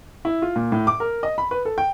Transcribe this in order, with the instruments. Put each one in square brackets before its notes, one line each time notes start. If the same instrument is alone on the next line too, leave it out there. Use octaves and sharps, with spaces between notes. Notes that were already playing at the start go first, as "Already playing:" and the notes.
[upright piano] E4
F4
A#2
A2
D6
A#4
D#5
B5
B4
A4
G5